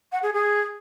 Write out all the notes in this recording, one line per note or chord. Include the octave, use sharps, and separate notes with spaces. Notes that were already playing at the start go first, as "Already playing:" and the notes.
F#5
G#4
G#4